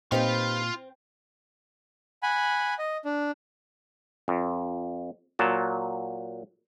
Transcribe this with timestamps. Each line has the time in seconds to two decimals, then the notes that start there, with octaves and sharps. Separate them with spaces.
0.12 A#2 C4 D#4 F4 G4 B4 F5
2.23 F#5 G#5 B5
2.79 D#5
3.05 D4
4.28 F2
5.39 A#2 F#3 A5